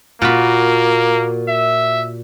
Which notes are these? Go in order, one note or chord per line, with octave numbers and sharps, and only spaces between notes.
A#2 A#3 F#4 B5
E5